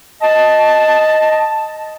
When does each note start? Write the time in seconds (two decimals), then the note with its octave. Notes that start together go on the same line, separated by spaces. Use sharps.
0.21 D#5 A5